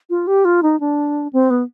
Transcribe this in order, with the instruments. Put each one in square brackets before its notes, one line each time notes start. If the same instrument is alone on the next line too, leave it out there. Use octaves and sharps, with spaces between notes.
[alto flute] F4
G4
F4
D#4
D4
C4
B3